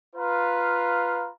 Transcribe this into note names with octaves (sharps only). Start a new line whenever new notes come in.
F4 B4 F5 A#5